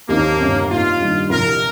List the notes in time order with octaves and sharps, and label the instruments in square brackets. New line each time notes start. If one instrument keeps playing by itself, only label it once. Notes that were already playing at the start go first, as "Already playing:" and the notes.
[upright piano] D#2 D#3 C4 D#4 G4 [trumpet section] A#3
[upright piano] G1 F2 C3
[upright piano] A#2 A#3 D#4 [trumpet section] F4
[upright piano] G2 D#3 G3
[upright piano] C2 A#2 F3 A#3 G4 [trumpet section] A#4